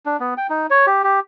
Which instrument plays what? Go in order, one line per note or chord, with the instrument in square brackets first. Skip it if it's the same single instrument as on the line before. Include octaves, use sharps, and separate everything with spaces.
[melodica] D4
B3
G5
D#4
C#5
G4
G4